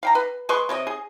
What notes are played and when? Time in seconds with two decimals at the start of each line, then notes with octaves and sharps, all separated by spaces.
0.03 F5 G5 A#5
0.15 B4
0.49 G#3 B4 C6 C#6
0.69 C3 C4 C#5 D#5
0.87 G#4